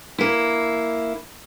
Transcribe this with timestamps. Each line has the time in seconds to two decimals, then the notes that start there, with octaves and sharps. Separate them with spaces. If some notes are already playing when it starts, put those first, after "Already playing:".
0.18 A#3 E4